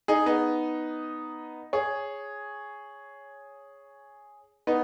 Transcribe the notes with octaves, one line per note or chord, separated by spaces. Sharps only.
D#4 G#4
B3 D#4
G#4 C#5
B3 D#4